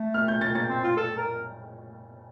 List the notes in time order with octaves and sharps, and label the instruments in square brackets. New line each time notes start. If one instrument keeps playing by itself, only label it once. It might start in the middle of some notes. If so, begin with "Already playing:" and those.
Already playing: [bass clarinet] A3
[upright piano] F6
G6
A6
[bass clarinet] A#3 [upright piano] A6
[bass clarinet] C4
F4
A4
A#4